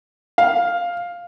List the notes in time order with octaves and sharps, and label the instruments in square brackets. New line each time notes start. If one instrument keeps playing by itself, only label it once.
[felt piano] F5